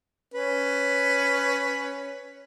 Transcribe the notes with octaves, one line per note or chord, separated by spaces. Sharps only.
C#4 B4